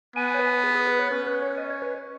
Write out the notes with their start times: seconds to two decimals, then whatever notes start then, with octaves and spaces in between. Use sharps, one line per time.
0.16 B3 G#5
0.34 C#5
0.39 B4
0.63 G#4
0.75 G#4
0.87 B4
0.99 C#5
1.11 C#4 B4
1.26 B4
1.42 C#5
1.57 D#5
1.70 C#5
1.82 B4